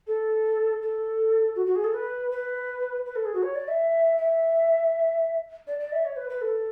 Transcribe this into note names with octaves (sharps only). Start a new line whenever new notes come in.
A4
A4
F#4
F#4
G#4
A4
B4
B4
B4
A4
G#4
F#4
C#5
D5
E5
E5
D5
D5
E5
C#5
B4
B4
A4